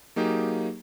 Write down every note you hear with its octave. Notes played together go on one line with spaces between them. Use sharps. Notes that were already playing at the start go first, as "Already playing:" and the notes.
F#3 A#3 D#4 G4 G#4